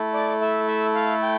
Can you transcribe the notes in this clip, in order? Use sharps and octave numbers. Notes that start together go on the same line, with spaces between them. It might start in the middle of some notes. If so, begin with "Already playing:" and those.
Already playing: A3 E4 A4
D5
E5
E5
F5
G5